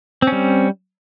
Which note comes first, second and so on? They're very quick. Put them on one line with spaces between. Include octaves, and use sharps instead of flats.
C4 C#4 G3